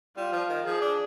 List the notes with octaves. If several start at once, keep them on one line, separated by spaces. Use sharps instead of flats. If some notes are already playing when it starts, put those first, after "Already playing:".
G3 F4
F3
D#3
F3 G#4
D4